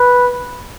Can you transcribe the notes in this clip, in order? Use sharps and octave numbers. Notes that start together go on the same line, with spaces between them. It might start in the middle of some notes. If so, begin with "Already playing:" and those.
Already playing: B4